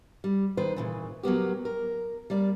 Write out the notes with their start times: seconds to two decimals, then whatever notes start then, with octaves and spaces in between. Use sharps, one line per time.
0.24 G3
0.57 D#3 B4 C5
0.76 A#2 C#3 E3
1.23 F#3 A#3 B3 G4
1.65 A#4
2.30 G3 A#3 D5